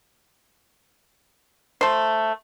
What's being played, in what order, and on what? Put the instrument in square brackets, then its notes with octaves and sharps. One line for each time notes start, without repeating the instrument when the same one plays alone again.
[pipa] A3 C5